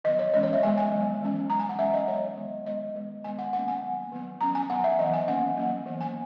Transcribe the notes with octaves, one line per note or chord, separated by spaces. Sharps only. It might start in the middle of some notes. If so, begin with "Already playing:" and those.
D#3 F#3 B3 D#5
C#5
E3 G#3 C#4 D#5
C#5
E5
D#3 G#3 B3 G#5
G#5
F#3 B3
E3 G#3 C#4
F#3 C#4 A#5
G#5
F#5
E3 G#3 C#4 E5
D#5
F#3 B3 C#5
D#3 G#3 B3
D#3 G#3 B3 D#5
D#3 G#3 B3
D#3 G#3 B3 G#5
F#5
D#3 A#3 C#4 F#5
G#5
F#3 B3
D#3 F#3 B3
F#3 C#4 A#5
G#5
F#3 B3 F#5
E5
E3 B3 D#5
G#5
D#3 A#3 C#4 F#5
F#3 A#3 C#4
E3 B3
G#5